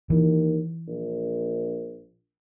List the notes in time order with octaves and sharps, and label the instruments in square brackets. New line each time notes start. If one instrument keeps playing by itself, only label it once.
[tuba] D#2 [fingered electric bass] E3
[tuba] A#1